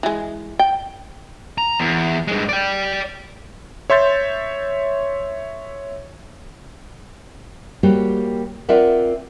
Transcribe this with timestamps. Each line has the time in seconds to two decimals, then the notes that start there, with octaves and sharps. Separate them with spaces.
0.03 E3 G#3
0.59 G5
1.58 A#5
1.80 E2
2.27 G2 G#3
2.49 D5 G5
3.90 C#5 E5 C6 G6 A6
7.83 G3 A#3 F#4 G4 C5 C#5
8.69 C4 F4 A#4 D5 E5 F#5